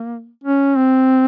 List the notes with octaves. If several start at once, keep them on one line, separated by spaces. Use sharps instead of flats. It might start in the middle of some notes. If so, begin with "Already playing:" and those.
Already playing: A#3
C#4
C4